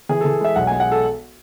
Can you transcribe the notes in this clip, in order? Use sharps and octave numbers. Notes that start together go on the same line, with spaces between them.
E3 G#4
E3 A4
G#3 E5
B1 F#5
G#3 G#5
F#5
A4